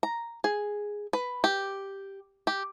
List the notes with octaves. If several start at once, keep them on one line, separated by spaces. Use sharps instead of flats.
A#5
G#4
B4
G4
G4